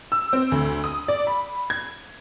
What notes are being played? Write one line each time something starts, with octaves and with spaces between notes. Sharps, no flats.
E6
C4
D2
D#6
D5
B5
G#6